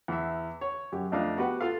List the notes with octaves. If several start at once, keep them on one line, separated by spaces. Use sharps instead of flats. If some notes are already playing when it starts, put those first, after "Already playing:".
E2 E5
C#5
F#2 G4
F2 A3 D4 D#5 F5
B3 F#4 G4 B4 F#5
F4 A4 F5